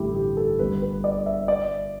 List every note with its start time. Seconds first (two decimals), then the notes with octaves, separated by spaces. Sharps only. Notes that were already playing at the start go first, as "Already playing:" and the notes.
Already playing: A1 G2 D3 A3 E4 G4
0.15 G4
0.37 A4
0.59 G1 G2 D3 A3 B4
0.82 B4
1.04 D5
1.26 E5
1.48 D5